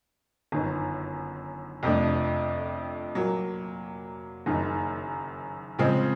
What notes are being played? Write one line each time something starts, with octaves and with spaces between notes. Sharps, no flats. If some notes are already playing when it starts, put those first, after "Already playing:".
G1 F#2 D#3
F2 C3 F3 A3 D4
A#2 F#3 A#3
F#1 F#2 D#3
C#3 F3 G#3 C4